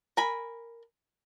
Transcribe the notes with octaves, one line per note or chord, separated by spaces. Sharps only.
A#4 G#5 B5